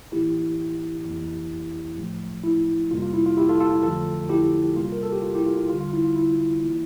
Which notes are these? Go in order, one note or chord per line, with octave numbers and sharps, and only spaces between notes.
A2 E3 A#3 E4 G4
F2 E3 A#3
A2 F3 A3
E4
F2 C3 G3 A#3 F4
F4
E4
F4
E4 G4
F4 A4
F4 A4
F4
F2 D3 F3 A3 F4 A4
E4 G4
E2 C3 G3 A#3 F4
A#4
A4
G4
F4
E4 G4
F4
F4
E2 D3 G3 F4
F4
E4
F4
E4
E3 A#3